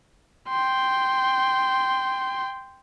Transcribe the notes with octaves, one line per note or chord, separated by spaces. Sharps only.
G5 C6